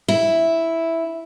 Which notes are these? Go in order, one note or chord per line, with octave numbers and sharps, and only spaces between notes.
E4